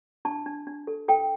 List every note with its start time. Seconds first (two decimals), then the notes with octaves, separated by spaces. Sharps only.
0.25 D4 A5
0.46 D4
0.67 D4
0.87 A4
1.08 A4 G5